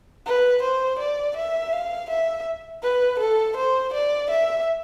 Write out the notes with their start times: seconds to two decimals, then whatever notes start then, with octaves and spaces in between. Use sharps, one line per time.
0.26 B4
0.62 C5
0.99 D5
1.36 E5
1.72 F5
2.10 E5
2.83 B4
3.20 A4
3.56 C5
3.93 D5
4.30 E5